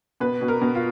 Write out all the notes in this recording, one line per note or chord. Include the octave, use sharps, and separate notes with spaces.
B2 B4
B2
A#4
B2
F4